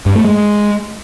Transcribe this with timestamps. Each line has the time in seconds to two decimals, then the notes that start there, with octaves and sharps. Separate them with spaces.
0.06 G2
0.15 A3
0.25 G#3